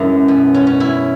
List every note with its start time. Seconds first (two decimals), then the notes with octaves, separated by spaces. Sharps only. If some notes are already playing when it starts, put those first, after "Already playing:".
Already playing: F#2 E3 G#3 C#4 E4
0.28 B2
0.54 C#4
0.67 C#4
0.80 E4